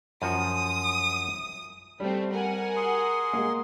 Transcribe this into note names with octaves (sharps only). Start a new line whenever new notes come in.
F#2 F3 F#4 D#6
G3 A3 C4
A#4 F#5 G#5
G#4 C6
G#3 A#3